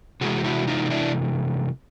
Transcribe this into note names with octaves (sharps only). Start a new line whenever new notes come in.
C3 E3 G#3 F#4 G#4
E4 F#4
D#4 F4
F4
D4 E4